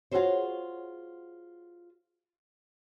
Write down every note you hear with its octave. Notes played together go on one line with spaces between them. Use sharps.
F4 F#4 G#4 A4 C5 C#5